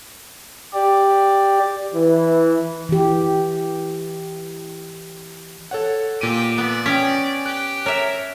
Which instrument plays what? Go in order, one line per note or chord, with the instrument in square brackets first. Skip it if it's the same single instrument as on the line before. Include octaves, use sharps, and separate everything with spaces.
[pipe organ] G4 D5
[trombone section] E3
[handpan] E3 G4
[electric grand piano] A4 C#5 F#5
[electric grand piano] A#2 D#7 [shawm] G4
[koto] B3 [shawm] D5
[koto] C#4 [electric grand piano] G5 G#5 B6
[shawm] G4 [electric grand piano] F#6
[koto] A#4 E5 [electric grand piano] C#5